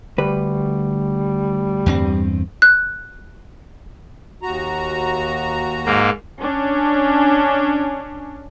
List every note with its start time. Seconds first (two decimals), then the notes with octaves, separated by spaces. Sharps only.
0.18 D2 G3 B4
1.86 E2 G2 C4
2.62 F#6
4.42 D#2 F#4 A#5
5.86 G#2 A#3
6.39 C#4 D4